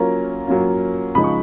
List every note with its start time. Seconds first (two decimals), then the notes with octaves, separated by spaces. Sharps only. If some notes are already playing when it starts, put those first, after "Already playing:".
Already playing: F#3 A#3 C#4 F4 A#4 A#5
0.47 F#3 A#3 C#4 F4
1.15 C#3 F3 G#3 D#4 B5
1.24 C#6